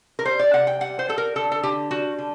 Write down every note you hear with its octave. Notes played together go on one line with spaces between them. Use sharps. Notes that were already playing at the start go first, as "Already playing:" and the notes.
A#4
G3 C5
D5
C3 F#5
G5
G3 F#5
C5
G3 A4
A#4
D3 A4
A4
D3 G4
G3 F#4
D3